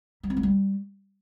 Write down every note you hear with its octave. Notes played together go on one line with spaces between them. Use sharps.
G3
C4
G#3
G3